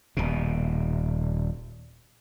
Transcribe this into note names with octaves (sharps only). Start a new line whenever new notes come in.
D#1 B2